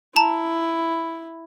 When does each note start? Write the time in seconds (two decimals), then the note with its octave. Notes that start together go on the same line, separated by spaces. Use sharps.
0.16 E4 A5 A#5